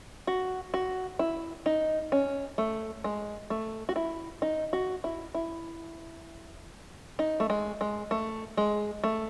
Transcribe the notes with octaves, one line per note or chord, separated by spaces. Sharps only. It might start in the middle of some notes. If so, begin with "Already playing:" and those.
F#4
F#4
E4
D#4
C#4
A3
G#3
A3
F#4
E4
D#4
F#4
E4
E4
D#4
A3
G#3
G#3
A3
G#3
A3